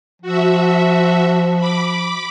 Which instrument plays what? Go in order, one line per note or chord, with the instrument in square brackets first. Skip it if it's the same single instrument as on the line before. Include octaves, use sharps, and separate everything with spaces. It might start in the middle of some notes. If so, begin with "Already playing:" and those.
[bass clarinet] F3 [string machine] F#4 E5
[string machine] B5 D6